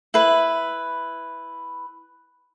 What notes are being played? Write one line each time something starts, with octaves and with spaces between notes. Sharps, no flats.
E4 B4